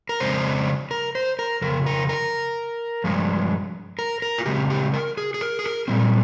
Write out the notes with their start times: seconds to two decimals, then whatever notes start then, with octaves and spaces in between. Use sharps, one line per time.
0.09 A#4
0.20 F2 C#3 G#3 C4 C5
0.91 A#4
1.15 C5
1.39 A#4
1.62 F2 C#3 A#4
1.86 A#4
2.09 A#4
3.04 G2 F3 G#3
3.99 A#4
4.22 A#4
4.38 F4
4.46 C#3 G#3 C4 G4
4.70 G4
4.94 A#4
5.17 G#4
5.34 G#4
5.41 A#4
5.59 G#4
5.64 A#4
5.88 A#2 G3 C4